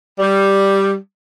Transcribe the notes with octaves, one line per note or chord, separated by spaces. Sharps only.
G3